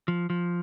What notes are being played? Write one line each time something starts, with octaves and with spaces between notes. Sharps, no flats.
F3
F3